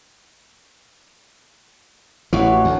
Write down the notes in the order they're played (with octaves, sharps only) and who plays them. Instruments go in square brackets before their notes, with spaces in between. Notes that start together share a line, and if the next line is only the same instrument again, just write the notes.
[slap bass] A1 E3 [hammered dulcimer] F#4 C#5
[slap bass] D2